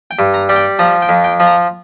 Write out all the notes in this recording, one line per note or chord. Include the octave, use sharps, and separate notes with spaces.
G5
G2
A#5
G3
G5
F3 A#5
G5
F2
G5
F3
A#5